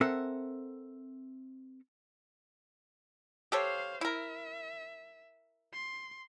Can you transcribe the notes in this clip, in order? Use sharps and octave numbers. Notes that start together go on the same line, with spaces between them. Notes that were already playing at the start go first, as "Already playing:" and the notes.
C4 A4 A#4 E5 F#5
G4 A4 C5 C#5 F5
E4 A#4 E5
C6